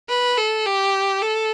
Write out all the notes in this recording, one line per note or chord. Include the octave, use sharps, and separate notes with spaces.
B4
A4
G4
A4